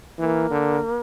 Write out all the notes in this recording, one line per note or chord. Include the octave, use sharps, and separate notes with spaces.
E3 A#3
D3